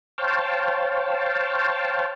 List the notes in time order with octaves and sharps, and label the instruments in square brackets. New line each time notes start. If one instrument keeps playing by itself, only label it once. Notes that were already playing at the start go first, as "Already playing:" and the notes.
[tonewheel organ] C5 C#5 F5 G5 A5